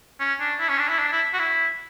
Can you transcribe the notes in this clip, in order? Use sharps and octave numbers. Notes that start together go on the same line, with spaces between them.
C#4
D4
E4
C#4
D4
E4
D4
E4
F#4
E4